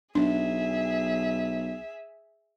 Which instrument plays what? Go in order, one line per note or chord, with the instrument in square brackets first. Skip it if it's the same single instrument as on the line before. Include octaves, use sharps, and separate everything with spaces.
[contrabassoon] B1 [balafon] D4 [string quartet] G#4 E5